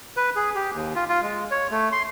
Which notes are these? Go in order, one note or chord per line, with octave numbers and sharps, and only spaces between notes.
B4
G#4
G4
D#2
F4
F4
G#3
C#5
A3
C6